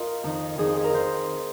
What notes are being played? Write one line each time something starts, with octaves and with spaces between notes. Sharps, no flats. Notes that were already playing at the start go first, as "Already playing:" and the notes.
Already playing: F4 A#4 D#5 F5
F2 D#3
F2 D#3 G#4
F4
G#4
A#4
D#3 C5